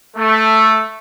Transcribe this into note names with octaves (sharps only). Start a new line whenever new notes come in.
A3